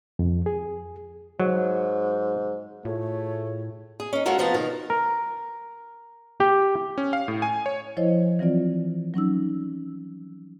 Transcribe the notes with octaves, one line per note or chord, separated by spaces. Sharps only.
F2
G#4
G#2 F#3
A2 A3 F4 G#4 C#5
G#4
C#4 D#4
G#3 C#4 F4 F#4 A4 A#4
C3 F3 B3 F5 A5 A#5
B2 D#3 A#4
A#4
G4
C#4
F5
A2
G#5
C#5
F3 E4 C5 C#5 D#5
E3 F#3 C4 F4 D5
F#3 C#4 D#4 E6